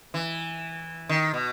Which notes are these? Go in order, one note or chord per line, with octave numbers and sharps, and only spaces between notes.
E3
D#3
B2